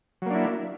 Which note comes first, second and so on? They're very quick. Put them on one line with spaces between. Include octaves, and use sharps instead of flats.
F#3 A#3 D4 E4